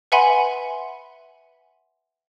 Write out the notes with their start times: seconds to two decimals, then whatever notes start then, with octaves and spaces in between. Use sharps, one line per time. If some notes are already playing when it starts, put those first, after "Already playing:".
0.12 B4 E5 F#5 G#5 B5 C6